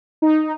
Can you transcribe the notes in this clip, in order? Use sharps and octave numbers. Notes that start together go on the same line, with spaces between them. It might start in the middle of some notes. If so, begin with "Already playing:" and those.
D#4